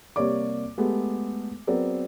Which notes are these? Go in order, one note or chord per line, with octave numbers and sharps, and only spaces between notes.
C3 G3 A#3 C#5 D5 D6
G#3 A3 B3 G4 A4
F#3 B3 C4 G#4 A#4 D5